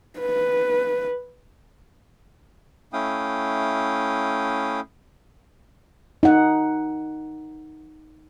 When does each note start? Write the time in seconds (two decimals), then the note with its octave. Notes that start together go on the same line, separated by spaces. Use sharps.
0.19 B4
2.93 A3 C#4 E4 F5 G5 D#6
6.23 D#4 F#5